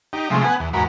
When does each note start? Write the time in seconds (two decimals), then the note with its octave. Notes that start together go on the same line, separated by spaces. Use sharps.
0.13 D#4 G4
0.30 C3 F3 G#3 A3
0.44 B3 F#5 G#5
0.60 E2
0.73 E2 G#2 F#4 A#4 B5